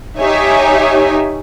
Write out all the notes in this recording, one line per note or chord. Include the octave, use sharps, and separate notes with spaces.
D#4 G4 C#5 E5 G#5